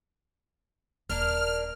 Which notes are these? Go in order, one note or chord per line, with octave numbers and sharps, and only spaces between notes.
D#1 A#3 D4 A#4 F6